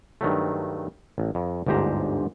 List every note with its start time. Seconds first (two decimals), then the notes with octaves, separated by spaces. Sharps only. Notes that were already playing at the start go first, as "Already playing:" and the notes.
0.21 G2 D#3 F#3 A3
1.18 A1
1.35 F2
1.67 G1 D2 G#2 G4 C5 A#5